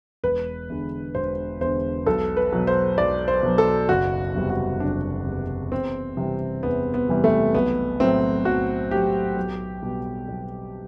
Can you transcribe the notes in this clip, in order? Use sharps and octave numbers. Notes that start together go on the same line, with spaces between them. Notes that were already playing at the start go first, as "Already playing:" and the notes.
E1 B4
E2 D3
E1 C5
E2 D3 C5
B1 A4
B4
B2 F#3
C5
B1 D5
C5
B2 F#3
A4
F#1 F#4
E2 C3 G3
F#4
F#1 D4
E2 C3 G3
E2 C4
C3 E3 G3
E2 B3
B3
C3 E3 G3
A3
B1 B3
A2 F#3 C4
B1 F#4
A2 F#3 G4
B1
B2 G3
B1